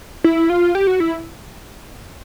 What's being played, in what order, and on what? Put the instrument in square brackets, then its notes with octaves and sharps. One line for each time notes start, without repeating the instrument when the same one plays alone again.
[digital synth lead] E4
F4
G4
F#4
E4